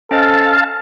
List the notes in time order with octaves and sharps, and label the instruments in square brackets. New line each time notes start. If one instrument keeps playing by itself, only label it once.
[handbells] C#4 C5 D#5 [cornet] A4 [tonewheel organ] F5 A5